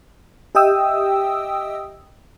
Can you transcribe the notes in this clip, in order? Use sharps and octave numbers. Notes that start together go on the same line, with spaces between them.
G4 D#5 E5 G5 D#6 E6